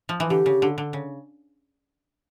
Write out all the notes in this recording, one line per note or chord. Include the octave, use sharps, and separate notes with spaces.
F3
E3
D3 G4
C#3
D3
D3
C#3